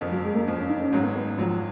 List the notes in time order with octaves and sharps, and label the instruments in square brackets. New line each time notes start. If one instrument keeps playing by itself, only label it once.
[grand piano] F#1 F2 F3
[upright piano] F#3
G#3
A#3
[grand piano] F#1 F2 F3
[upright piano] C#4
D#4
C#4
[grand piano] G#1 G#2 F#3 [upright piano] C#4
[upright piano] B3
B3
[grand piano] G#1 G#2 F#3 [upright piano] F3